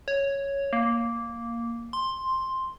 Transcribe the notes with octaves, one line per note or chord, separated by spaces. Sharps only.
C#5
A#3
C6